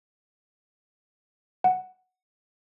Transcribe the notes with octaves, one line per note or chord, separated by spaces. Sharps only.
F#5